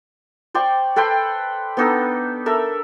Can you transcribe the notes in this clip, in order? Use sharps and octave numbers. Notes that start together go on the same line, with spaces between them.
C5 D5 G5 C#6
A4 B4 G5 C6
B3 D4 D#4 A4
A4 A#4 E5